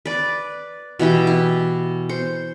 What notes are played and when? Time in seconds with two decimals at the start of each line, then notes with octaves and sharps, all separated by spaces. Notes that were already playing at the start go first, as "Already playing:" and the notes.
0.05 B4 D5
0.99 B2 E3 E4 G4
1.27 E4
2.09 C5